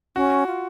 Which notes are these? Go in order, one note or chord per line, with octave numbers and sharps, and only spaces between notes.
C#4 F#4
F4